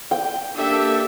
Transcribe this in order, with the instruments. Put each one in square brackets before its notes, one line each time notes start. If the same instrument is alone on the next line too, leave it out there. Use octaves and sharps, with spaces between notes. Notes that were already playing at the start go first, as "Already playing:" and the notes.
[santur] G5
[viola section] A#3 A4 E5 [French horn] D4 [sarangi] G4